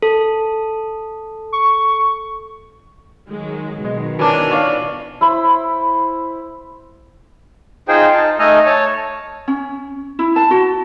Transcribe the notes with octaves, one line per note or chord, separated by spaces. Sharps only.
A4
C#6
D#3 F#3 G#3
B2 D#3 G#3
E3 C#4 D4 A#4
C#5 D5 F5
E4 C5 B5
D#4 F4 G#4 C5 G5
D#4 A5
A3 D#4 A4 D#5 G#5 F6
C#5 A5
C#4
E4
A5
F#4